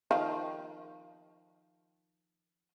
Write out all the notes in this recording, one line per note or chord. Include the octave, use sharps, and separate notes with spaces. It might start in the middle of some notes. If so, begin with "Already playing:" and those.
D#3 F3 F5